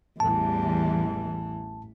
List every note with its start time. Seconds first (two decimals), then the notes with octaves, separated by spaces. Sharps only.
0.20 A1 E2 E3 G3 A5